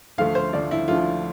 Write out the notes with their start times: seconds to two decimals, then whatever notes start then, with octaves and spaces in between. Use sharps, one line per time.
0.18 D2 D3 F3 A3 F5
0.35 C5
0.53 D2 D3 F3 A3 D5
0.71 E4
0.88 D2 D3 F3 A3 F4